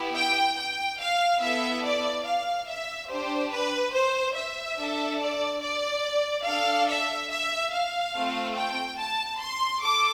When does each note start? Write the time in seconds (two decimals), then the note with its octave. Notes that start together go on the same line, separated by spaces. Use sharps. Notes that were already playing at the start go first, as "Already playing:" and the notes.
Already playing: B3 E4 G4
0.16 G5
0.57 G5
1.00 F5
1.42 B3 E4 A4 E5
1.84 D5
2.26 F5
2.68 E5
3.09 D4 G4 C5
3.52 B4
3.94 C5
4.36 E5
4.78 D4 A4
5.20 D5
5.62 D5
6.46 D4 A4 F5
6.88 E5
7.30 E5
7.72 F5
8.14 A3 C4 F4 A4
8.56 G5
8.98 A5
9.40 C6
9.82 A4 D6